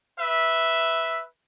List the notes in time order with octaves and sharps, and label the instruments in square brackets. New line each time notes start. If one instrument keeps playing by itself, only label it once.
[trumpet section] B4 E5